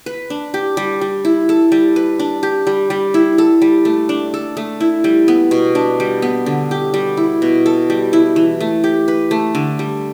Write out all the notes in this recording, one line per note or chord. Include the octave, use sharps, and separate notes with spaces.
B4
D4
G4
G3
G3
E4
A4
G3
B4
D4
G4
G3
G3
E4
A4
G3
A3
D4
A4
A3
E4
G3
B3
B2
D4
G3
B3
D3
G4
G3
E4
B2
A4
G3
E4
E3
A3
G4
B4
A3
D3
G3